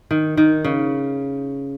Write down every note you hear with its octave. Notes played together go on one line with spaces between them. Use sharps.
D#3
D#3
C#3